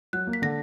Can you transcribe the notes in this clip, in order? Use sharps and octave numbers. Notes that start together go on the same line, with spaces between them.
F#3 F#6
A#3
B6
D3 A#6